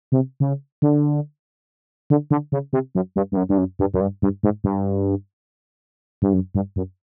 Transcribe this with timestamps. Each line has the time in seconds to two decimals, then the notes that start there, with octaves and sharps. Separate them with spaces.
0.12 C3
0.40 C#3
0.82 D3
2.10 D3
2.31 D3
2.52 C#3
2.73 C3
2.95 F#2
3.16 G2
3.32 G2
3.37 F#2
3.49 G2
3.58 F#2
3.79 G2
3.94 F#2
4.01 G2
4.22 G2
4.43 G#2
4.64 G2
6.22 G2
6.33 F#2
6.55 G2
6.76 F#2